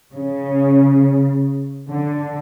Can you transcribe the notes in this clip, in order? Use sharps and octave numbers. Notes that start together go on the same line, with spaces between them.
C#3
D3